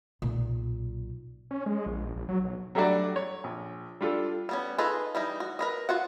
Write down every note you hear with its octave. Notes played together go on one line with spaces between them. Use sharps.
B1 A#2
C#4
G#3
A#1
A#1
F#3
B1
F#3 G3 A3 D4 F#4 D5
C#5
A#1
G3 D4 F4 A4
G3 B3 C#4
D#4 F4 G#4 A4 B4
E3 G3 D#4
F#4
A#4 B4 D#5
F4 F#4 F#5